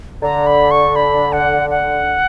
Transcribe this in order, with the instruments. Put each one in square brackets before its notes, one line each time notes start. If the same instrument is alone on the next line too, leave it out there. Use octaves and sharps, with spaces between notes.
[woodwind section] D3 [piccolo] A#5
[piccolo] B5
C#6
B5
F#5
F#5